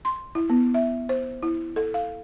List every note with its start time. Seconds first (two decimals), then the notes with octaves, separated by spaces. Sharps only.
0.05 C6
0.35 E4
0.50 B3
0.74 E5
1.09 C5
1.43 E4
1.76 A4
1.94 F5